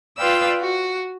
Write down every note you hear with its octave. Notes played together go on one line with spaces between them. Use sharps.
F4 B4 D5 F5 G5 E6
F#4